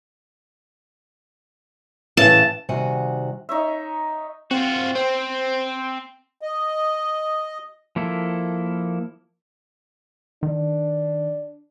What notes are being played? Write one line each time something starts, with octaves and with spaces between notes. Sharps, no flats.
A2 C#3 E3 A5
C3 D#3 G3 F#4 F#5 G#5
D#4 C#5 E5
C4 F4 F#4
C4 C5
D#5
F3 A#3 E4 A4
D#3 D4